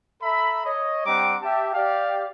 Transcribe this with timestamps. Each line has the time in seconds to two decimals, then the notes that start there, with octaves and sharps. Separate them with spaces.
0.22 A4 E5 A#5 B5
0.65 C#5 D#5
1.05 G3 C4 D4 F#5 A#5 D6
1.42 G4 E5 A5
1.73 G4 D5 F5